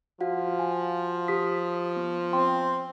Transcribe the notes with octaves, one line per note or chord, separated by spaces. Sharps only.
F3 F#4 F5 F#5
G#5
G4 D#6 B6
B3
C4 G5 C6